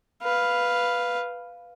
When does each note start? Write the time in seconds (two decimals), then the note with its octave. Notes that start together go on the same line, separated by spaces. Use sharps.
0.23 B4 F5